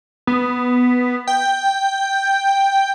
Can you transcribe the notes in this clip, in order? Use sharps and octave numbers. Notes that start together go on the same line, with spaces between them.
B3
G5